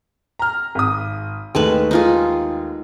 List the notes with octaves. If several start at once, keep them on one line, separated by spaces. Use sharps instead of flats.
A#5 F6
G#1 D#6
D#2 D#3 G#3 A3 B4
D#4 F4 G#4